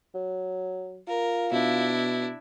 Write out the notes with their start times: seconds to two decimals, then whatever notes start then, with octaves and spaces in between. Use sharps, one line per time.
0.14 F#3
1.08 F4 A#4
1.52 B2 D4 E4